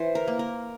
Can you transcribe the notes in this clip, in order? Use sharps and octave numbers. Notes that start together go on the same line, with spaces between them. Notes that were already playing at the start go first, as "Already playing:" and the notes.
Already playing: E3 C5
A#4
A#3
A#4